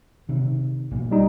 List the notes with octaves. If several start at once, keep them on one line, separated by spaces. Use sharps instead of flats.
C3 D#3
B1 A#2
G3 D#4